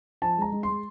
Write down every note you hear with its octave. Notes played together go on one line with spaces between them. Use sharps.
F3 A5
G#3 A#5
G#3
G#3 C6